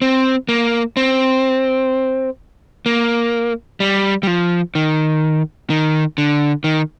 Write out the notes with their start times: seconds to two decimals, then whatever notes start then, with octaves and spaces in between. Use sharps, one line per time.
0.02 C4
0.49 A#3
0.97 C4
2.86 A#3
3.80 G3
4.23 G3
4.27 F3
4.75 D#3
5.70 D#3
6.18 D3
6.64 D#3